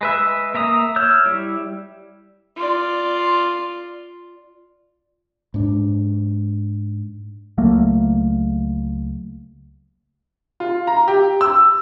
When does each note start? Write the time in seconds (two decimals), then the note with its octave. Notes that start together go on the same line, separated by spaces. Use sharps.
0.01 G#3 B4 E5
0.54 A#3 E5 A#5 D#6
0.96 C#5 E6 F6 G6
1.26 G3 E4
2.56 F4 D5
5.54 G#2 D4
7.58 C#2 F#3 A3 A#3
10.60 F4
10.87 A#5
11.08 G4
11.41 E6